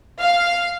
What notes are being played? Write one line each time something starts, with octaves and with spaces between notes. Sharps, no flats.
F5